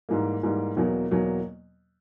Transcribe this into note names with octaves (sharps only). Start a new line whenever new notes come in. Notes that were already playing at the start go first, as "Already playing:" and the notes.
G#2 E3 G3 A#3
G#2 E3 G3 A#3
E2 B2 F#3 A#3
E2 B2 F#3 A#3